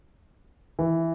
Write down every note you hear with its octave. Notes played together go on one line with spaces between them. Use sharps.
E3